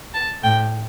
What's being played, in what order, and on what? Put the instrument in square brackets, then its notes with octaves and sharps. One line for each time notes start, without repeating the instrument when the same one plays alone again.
[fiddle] A5
[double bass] A2 [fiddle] G5